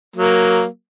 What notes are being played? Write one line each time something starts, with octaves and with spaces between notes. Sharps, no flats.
F#3 A#3